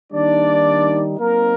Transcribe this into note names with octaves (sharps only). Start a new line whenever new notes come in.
D#3 G3 A#3 D4 D#4 D5
F#3 A#3 C4 D#4 A#4